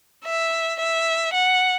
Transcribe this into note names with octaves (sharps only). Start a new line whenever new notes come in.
E5
E5
F#5